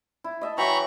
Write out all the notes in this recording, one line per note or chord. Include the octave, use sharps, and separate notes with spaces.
E4
D#5 E5 A5
E3 F#3 G5 A#5 B5 C#6